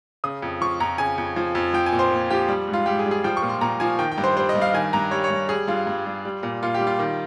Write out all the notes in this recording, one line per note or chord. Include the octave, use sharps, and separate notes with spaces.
C#3 D#6
F2
F3 C#6
F2 A#5
C#3 G#5
F2
F3
F2
F3 G5
G#5
A#2
C5
A#2
F3 G4
G3
G#2
F4
G#2 G4
G#4
G3
G#4
F3 G5
C#6
A#2
C6
A#2 A#5
F3 G#5
D#3 G5
G5
G2
C5
G3 C5
D#5
G2
F5
D#3 G#5
G2 A#5
G3 C#5
C#5
G2
G3 G#4
G2 F4
G2
G3
G3
A#2
A#2 F4
G4
G3
F4
D#3